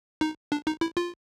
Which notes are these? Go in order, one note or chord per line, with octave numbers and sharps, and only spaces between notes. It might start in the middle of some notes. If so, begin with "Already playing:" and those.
D#4
D4
D#4
E4
F4